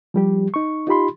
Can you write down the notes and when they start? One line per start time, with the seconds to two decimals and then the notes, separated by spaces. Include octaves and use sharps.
0.14 F3 G3 G4
0.54 D#4 C#6
0.87 D#4 F4 G4 B5 C6